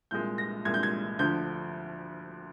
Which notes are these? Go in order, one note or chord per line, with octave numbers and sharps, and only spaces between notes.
C2 A#2 G#3 G6
A#6
C2 A#2 G#3 G#6
G6
G#6
D2 D3 F3 G6